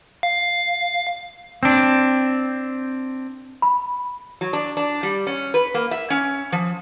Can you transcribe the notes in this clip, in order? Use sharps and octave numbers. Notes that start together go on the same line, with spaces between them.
F5
C4 D4
B5
F#3
D4
D4
G3
C#4
B4
A#3
E5
C#4
F3